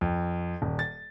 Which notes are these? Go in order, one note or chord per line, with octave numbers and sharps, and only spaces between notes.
F2
D#1
A6